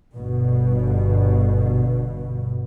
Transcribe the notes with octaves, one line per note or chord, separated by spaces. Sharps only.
G1 B2